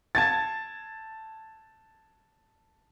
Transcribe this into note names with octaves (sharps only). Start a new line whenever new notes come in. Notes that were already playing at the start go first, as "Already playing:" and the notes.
A5 G#6 A6